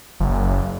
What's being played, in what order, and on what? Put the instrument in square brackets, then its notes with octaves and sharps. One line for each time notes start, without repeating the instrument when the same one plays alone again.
[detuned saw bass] F#1